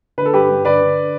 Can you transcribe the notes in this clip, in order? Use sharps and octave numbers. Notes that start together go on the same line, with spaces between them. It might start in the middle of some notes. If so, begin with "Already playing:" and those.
D3 B4
A4
G2 G4 B4
G2
D3 B4 D5
D3